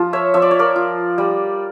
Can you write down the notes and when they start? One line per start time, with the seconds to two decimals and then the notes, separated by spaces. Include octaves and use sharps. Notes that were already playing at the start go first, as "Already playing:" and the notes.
Already playing: F3 F4 A5
0.13 C#5 E5
0.34 F3 E5
0.42 D5
0.51 C#5
0.59 A#4 D5
0.76 F4
1.18 G3